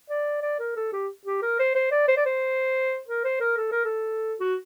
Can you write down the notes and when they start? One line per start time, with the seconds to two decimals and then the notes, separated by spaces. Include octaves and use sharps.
0.10 D5
0.42 D5
0.60 A#4
0.76 A4
0.93 G4
1.25 G4
1.42 A#4
1.59 C5
1.75 C5
1.91 D5
2.08 C5
2.17 D5
2.25 C5
3.08 A#4
3.24 C5
3.40 A#4
3.57 A4
3.72 A#4
3.85 A4
4.40 F#4